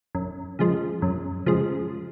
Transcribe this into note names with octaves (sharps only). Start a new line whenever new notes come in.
F#2
C#3 F3 G#3
F#2
C#3 F3 G#3